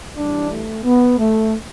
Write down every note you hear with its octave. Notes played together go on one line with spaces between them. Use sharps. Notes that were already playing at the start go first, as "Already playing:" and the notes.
G2 E3 G3 D4
A3
B3
A3